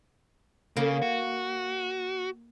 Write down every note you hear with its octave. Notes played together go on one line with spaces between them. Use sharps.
C#3 A#3
F#4